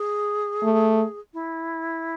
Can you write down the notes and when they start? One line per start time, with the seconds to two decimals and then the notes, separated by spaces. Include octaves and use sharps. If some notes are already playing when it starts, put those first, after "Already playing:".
Already playing: G#4
0.63 A3
1.34 E4